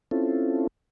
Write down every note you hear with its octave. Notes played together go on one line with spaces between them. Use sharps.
C4 C#4 E4 F4 A4